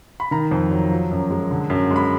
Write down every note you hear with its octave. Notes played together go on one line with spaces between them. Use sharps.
B5
D#3 A#5
F2
F#3
F3
F#2
G#3
D3
F#2
G#3
B5